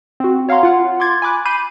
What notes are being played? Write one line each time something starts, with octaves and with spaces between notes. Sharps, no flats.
C4 F#4
C#5 F5 F#5 A#5 C6
F4 F#5
C6 D6 G#6 A6
G#5 B5 D6 F#6
B5 D6 G6 C7 D#7